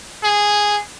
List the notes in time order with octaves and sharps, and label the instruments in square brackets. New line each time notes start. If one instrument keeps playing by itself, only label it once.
[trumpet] G#4